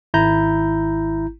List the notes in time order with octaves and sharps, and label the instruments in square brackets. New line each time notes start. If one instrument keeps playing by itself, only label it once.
[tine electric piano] G#1 E4 A#5 G6